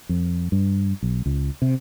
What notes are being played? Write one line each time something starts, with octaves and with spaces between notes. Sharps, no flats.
F2
G2
B1
C#2
C3